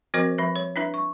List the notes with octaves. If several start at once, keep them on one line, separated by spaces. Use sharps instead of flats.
F3 C4 F#4 A#4 C5 D#5
F3 B4 E5 B5
C#5
D4 E4 B4 E5
C#6